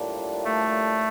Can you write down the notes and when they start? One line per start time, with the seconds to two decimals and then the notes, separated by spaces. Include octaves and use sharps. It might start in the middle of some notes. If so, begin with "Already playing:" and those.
Already playing: A2 G3 A#3 D4 F4
0.45 A3